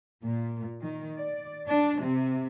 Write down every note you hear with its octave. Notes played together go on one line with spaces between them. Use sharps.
A#2
D#3
D5
D4
C3